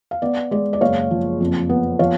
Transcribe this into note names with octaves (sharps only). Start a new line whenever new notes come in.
F5
B3 D5
G#3 D5
D5
F#1 C#5 F5
F3
F2
B3
F3 C#5 F5